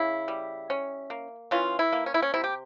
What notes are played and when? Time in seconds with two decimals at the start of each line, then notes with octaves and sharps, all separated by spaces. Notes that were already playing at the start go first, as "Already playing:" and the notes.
Already playing: C#3 E4
0.28 G3
0.70 C#4
1.10 A#3
1.51 E3 C#4 F4
1.79 E4
1.93 A#3
2.06 C#4
2.14 E4
2.22 C#4
2.34 C3 E4
2.44 G4